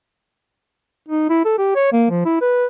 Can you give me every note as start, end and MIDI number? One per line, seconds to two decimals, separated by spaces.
1.09 1.27 63
1.30 1.43 64
1.45 1.57 69
1.58 1.71 67
1.76 1.88 73
1.93 2.07 58
2.10 2.25 53
2.25 2.40 64
2.41 2.66 71